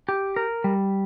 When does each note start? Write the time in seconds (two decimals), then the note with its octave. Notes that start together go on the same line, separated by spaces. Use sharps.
0.09 G4
0.36 A#4
0.64 G3